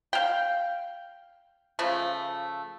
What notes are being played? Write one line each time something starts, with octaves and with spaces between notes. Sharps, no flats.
F5 G5
C#3 F3 A3